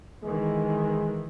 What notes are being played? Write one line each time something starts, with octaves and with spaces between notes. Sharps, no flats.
D#3 E3 G#3